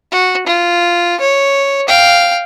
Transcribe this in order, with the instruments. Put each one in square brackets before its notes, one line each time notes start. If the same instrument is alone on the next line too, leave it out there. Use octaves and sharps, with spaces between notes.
[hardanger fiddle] F#4
F4
C#5
F5 G5